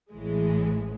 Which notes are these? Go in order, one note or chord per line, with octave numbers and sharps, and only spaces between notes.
A1 A2 E3 G#3